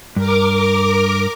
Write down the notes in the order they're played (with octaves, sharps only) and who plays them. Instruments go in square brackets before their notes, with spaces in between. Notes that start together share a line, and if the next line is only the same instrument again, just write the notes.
[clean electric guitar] G2 [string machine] A#4 D6